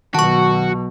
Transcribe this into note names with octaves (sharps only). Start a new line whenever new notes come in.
B1 B2 D#3 F#4 A5 C#6